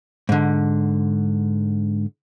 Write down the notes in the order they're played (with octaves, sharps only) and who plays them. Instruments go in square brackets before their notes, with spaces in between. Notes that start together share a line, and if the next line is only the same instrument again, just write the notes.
[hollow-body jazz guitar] G#2 D3